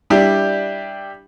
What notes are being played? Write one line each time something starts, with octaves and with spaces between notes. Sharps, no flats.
G3 D4 E4 G4